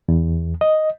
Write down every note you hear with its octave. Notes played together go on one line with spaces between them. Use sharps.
E2
D#5